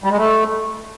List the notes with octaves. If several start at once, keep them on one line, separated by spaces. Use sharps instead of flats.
G3
G#3
A3